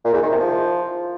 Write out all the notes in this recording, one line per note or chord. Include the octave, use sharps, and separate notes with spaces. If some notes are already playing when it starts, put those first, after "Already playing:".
A#2
E2
D#3
C3
F3